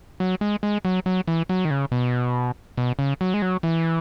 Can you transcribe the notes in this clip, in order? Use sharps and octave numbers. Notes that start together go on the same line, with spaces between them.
F#3
G#3
G#3
F#3
F#3
E3
F#3
D#3
C#3
B2
B2
C#3
F#3
G#3
F#3
E3